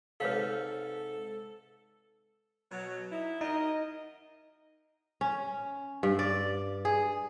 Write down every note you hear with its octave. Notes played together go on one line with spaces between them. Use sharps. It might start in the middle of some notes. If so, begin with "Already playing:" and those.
G#2 C3 A4 B4 C#5 F5
B2 F#3
D#4 E4
F#3 D#4 A#4 D#5
C#4
G2
D5
G#4